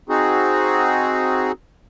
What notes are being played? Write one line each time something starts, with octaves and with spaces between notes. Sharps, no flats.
C4 D#4 F#4 G#4